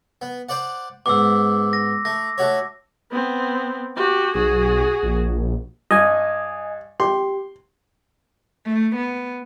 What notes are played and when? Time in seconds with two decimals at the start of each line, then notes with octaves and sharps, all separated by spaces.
0.22 B3
0.49 C5 D5 F#5
1.06 G#2 B2 D6 E6
1.73 A#6
2.05 A3 A#6
2.38 A3 F#4 C#5
3.11 B3 C4
3.97 F#4 G4
4.35 B1 F#4 G#4
5.03 A#1
5.91 G2 D#5 G#5
7.00 G4 C6
8.66 A3
8.96 B3